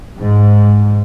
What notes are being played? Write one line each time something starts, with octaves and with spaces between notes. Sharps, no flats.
G#2